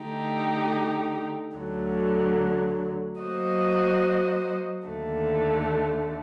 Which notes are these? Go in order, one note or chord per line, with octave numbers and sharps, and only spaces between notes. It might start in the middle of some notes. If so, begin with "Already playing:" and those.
Already playing: D3 A3 D#4 G4
D2 D3 F#3
F#3 A#3 F#4 C5 D#5
D#2 D3 A3